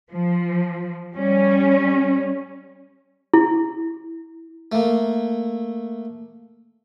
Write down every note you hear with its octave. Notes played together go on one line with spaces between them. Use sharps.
F3
G3 C#4
E4
A3 A#3